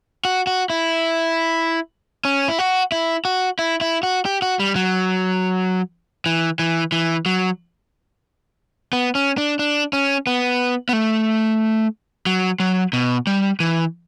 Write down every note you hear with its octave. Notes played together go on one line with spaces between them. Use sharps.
F#4
F#4
E4
C#4
E4
F#4
E4
F#4
E4
E4
F#4
G4
F#4
G3
F#3
E3
E3
E3
F#3
B3
C#4
D4
D4
C#4
B3
B3
A3
F#3
F#3
B2
G3
E3